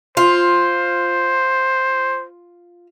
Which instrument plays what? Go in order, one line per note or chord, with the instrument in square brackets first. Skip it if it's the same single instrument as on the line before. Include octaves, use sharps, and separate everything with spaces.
[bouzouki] F4 [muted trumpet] C5